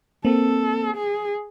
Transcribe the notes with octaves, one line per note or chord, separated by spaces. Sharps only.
A#3 C4 A4
G#4